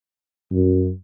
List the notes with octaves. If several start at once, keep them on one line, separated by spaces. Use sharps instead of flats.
F#2